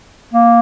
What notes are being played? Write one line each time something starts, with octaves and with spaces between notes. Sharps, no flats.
A#3